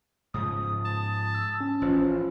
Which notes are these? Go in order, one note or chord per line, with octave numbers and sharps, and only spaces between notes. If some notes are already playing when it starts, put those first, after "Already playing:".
G#2 C#3 F3 D#6
A5
E6
C#4
A1 F3